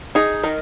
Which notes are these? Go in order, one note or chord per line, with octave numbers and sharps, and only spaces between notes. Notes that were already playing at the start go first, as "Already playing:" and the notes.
D#4 G#4
D#3 A#4